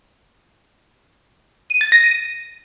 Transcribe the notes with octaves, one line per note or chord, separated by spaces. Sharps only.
D#7
A6
A#6
D#7